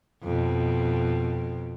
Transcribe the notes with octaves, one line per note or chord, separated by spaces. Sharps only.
F2 B2